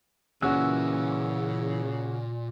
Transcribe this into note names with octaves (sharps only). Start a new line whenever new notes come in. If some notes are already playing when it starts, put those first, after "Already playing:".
A#2 C#3 E3 C#4 F#4 E6 F#6